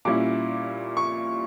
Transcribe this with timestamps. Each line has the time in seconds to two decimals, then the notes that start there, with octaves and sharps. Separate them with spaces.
0.05 A#2 G3 C#4 E4 D6
0.97 C#6